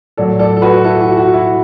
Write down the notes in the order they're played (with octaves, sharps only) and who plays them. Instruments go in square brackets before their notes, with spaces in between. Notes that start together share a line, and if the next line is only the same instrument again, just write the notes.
[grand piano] A2 F#3 A4 D5
A4 D5
A4
F#4 B4
E4 A4
F#4
F#4
E4